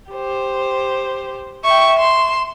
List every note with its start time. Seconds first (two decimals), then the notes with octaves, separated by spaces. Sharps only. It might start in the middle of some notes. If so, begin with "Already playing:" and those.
0.11 G4 C5
1.65 E5 G5 C#6
1.99 C6 E7